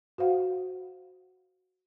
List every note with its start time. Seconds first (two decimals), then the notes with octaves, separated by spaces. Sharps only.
0.18 F#4 C5 F5 F#5